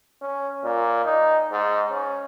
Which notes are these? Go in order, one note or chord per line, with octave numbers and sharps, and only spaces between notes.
C#4
A#2
D#4
G#2
C#4